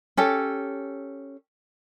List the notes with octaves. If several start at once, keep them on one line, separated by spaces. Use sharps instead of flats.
C#4 G4 A4